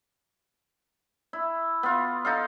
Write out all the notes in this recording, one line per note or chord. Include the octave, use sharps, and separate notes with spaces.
E4
B3 F4
D#4 A4 F5